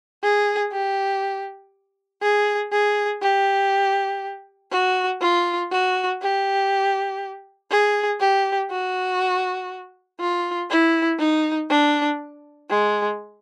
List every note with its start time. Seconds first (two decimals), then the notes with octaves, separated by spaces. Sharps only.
0.23 G#4
0.73 G4
2.22 G#4
2.72 G#4
3.22 G4
4.71 F#4
5.22 F4
5.72 F#4
6.22 G4
7.71 G#4
8.20 G4
8.71 F#4
10.20 F4
10.70 E4
11.19 D#4
11.70 D4
12.70 G#3